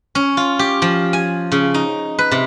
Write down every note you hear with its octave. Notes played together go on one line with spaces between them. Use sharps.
C#4
F4
G4
F3
G#5
C#3
D#4
B4
C3